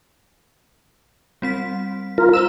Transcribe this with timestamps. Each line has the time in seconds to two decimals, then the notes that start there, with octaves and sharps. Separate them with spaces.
1.42 G3 C4 B6
2.18 F4 A#4
2.34 F4 C5 E6 E7